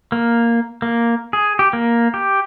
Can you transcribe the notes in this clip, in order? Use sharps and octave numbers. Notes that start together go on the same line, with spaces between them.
A#3
A#3
G#4
G4
A#3
G4